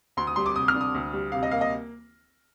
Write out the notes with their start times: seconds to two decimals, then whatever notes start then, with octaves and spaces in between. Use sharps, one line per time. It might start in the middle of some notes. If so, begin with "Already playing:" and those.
0.17 D2 C6
0.27 D#6
0.36 G3 C6
0.46 D6
0.56 C3 D#6
0.68 F6
0.74 D4
0.81 D#6
0.95 D2
1.13 G3
1.32 C3 F5
1.43 D#5
1.51 A#3 F5
1.61 D#5